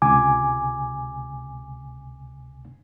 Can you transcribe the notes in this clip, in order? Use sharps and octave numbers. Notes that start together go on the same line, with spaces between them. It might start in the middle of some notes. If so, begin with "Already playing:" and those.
C#2 C3 G#5 D6